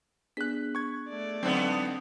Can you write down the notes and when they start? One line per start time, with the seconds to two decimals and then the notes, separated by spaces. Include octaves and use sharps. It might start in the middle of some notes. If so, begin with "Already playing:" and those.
0.37 B3 D4 G#4 F#6 B6
0.75 C#6 G#6
1.09 A3 D5
1.43 G2 D3 F#3 B3 C4